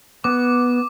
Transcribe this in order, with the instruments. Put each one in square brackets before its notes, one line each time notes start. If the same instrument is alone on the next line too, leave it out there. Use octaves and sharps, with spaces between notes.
[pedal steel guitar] B3 [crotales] D6